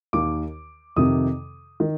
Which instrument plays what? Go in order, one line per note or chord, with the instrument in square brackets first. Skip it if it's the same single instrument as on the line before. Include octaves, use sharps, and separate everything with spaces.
[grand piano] D#2 D#3 D6
F2 C3 D#3 D#6
D#3